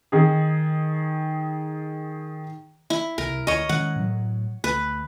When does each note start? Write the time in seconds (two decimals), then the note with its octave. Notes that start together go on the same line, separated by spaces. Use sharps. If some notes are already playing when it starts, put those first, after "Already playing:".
0.12 D#3 G#4
2.90 E4
3.18 C2 A#4
3.47 D2 C#5 D#5
3.69 D#3 G#3 C#4 F#5
3.96 A2 F#3
4.64 D2 B4